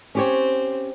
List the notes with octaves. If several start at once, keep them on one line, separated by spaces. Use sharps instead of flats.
C4 C#4 G4 C#5